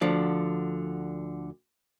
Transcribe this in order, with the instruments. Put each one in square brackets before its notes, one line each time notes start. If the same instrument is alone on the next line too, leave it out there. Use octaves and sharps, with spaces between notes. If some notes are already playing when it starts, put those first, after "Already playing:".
[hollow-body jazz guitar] D2 D3 F3 D5